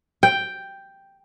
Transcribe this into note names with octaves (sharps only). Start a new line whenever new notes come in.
G5